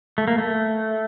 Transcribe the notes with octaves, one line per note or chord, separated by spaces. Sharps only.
A3
A#3
A3